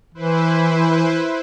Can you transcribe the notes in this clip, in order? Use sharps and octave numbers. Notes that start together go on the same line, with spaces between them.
E3 E4 B4 C5